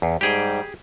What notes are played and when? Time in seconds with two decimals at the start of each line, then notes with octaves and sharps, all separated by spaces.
0.02 E2
0.21 G#2 G3 G4 G#4 G5